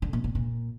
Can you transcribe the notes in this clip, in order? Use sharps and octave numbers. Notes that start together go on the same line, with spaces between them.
D3
A#2
A#2
A#2